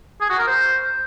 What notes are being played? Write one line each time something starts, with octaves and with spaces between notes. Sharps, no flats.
G#4
F#4
A#4
C5